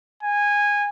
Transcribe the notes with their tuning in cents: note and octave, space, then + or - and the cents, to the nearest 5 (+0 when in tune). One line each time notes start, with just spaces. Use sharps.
G#5 -15